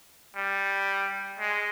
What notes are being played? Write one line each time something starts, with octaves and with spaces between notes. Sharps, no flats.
G3
G#3